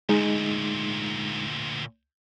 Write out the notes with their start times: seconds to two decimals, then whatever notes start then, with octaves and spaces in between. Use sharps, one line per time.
0.09 D2 A#2 G#3 D#4